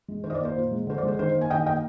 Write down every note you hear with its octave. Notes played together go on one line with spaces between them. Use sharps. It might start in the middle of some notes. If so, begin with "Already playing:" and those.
G#3
D#3 C5
D#5
D5
A#3
C5
A#2
G#3
D3 C5
D5
G#3 C5
D#3 C5
A#3
G#5
D#3 D#5 G5
A#3 D#5 G5